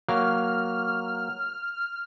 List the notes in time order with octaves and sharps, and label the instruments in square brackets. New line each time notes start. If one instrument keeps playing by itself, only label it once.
[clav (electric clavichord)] F#3 A#3 [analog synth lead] F6